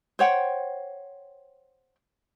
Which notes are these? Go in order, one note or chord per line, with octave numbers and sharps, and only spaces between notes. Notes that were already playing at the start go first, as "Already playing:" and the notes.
C5 C#5 F#5 G5